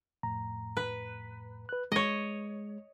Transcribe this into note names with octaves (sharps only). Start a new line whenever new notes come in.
F2 A2 A#5
B4
B4 F#6
G#3 C#5 D#5